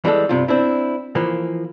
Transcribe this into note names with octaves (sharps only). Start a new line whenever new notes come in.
E3 G3 G#3 A4
G2 C3 F4
C4 D4 E4
E3 F3 A#3